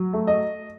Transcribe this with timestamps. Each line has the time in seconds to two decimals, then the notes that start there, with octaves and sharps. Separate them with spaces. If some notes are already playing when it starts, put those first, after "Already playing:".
Already playing: F#3
0.13 A3
0.27 D#5